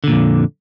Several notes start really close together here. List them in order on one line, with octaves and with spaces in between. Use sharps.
D3 A#2 F2